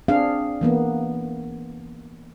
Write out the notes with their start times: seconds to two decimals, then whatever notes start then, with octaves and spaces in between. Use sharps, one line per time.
0.08 C4 D4 G#4 F5
0.61 E3 A#3 B3